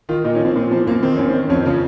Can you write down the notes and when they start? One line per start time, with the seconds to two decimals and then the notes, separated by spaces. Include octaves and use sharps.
0.09 D#3 F4
0.24 A#2 D#4
0.35 C#4
0.40 F3 C4
0.55 A#2 C4
0.71 F3 C4
0.87 F#2 A#3
1.03 D#3 C4
1.16 F#2 C#4
1.29 C4
1.34 D#3
1.49 F2 C#4
1.65 C#3 F3 C#4